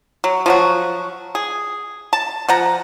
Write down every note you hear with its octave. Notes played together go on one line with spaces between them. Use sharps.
F#3
F3 F#3 F#4
G#4
A5
F3 F#5 A#5